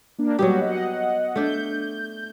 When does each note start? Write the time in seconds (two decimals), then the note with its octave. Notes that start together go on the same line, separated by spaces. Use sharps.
0.19 A#3 D4
0.39 F#3 G3 B3 F#4 G4
0.61 D#5 F#5
1.36 A3 D4 G6